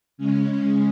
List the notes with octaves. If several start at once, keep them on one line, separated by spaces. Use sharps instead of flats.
C#3 G#3 C#4